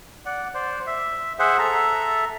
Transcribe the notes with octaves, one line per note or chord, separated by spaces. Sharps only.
D5 F#5
C5 D5
E5
G#4 C5 E5 F#5
A4 E5 A#5